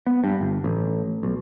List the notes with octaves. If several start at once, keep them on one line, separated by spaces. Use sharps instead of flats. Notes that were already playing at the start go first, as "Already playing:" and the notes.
B3
G2
G1
A1
B1